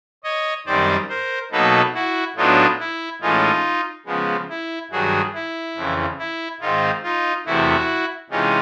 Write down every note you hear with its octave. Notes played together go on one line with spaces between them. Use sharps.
C#5 D#5
F#2 D#3 G3 C4 D#4 C5 D5
A#4 C5
B2 F#3 A#3 D#4 A4 B4
E4 F#4
A2 F#3 B3 D4 D#4 F4
E4
A2 E3 G#3 C#4 D#4 F4
C#3 F3 G#3 B3
E4
G2 D#3 F#3 F#4 G#4
E4
F2 C#3 E3
E4
G#2 D#3 G#3 C4 D#4 F4
D#4 F4
E2 C3 E3 A3 E4 F#4
C3 E3 G#3 C#4 D#4 F4